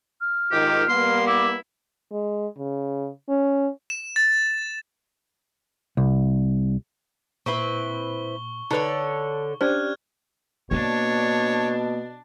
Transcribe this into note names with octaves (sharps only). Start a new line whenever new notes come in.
F6
G#2 D#3 F4 G4
G3 A#3 B3 C6
E4 D6
G#3
C#3
C#4
E7
A6
C2
A#2 C4 E4 B4 C#6 G7
D3 D#4 A4 B4 C#5 A5
C#4 D4 G4 C5 D5 F6 F#6 G#6
B2 A#3 D4 C#5